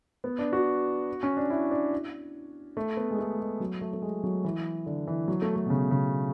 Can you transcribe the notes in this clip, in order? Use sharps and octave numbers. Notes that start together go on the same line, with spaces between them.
B3
D4
F#4
C#4
D4
E4
D4
A3
B3
G#3
A3
G#3
F#3
A3
A3
G#3
F#3
E3
D3
E3
F#3
A3
A3
B2
C#3
C#3